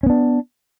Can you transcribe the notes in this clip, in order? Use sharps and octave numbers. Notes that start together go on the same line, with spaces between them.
B3 C#4 D4